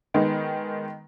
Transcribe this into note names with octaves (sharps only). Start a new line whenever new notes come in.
D#3 G#3 B3 D#4